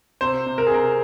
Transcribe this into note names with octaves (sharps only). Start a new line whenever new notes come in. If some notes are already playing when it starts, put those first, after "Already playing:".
C3 C5
C3
A#4
G#4
C3 A#4